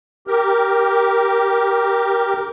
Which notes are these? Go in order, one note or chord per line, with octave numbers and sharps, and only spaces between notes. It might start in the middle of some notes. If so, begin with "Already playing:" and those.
G4 A#4